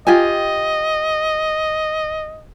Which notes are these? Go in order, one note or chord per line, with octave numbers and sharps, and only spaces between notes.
F4 G4 D#5 G#5